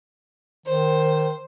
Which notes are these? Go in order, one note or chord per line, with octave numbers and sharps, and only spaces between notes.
D#3 C5